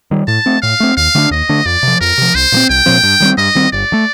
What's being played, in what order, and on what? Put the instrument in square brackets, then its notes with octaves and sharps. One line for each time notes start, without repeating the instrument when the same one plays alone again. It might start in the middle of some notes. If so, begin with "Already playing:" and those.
[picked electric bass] D#3 G3
[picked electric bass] A2 [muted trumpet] A5
[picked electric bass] A3 C4
[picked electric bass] A2 [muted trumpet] F5
[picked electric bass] A3 C4
[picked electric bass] D#2 [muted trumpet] F5
[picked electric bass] D3 A3 D4
[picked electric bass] D#2 [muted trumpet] D#5
[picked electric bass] D3 A3 D4
[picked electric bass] F2 [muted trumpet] D5
[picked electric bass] C3 F3
[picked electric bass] F2 [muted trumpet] A#4
[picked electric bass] C3 F3
[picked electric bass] C2 [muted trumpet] C5
[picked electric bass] A#2 F3
C4
[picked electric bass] C2 [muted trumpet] G5
[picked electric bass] A#2 F3 C4
G2
D#3 G3 C4
[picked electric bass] G2 [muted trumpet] D#5
[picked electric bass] D#3 G3 C4
[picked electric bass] G1 [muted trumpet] D5
[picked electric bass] D3 A3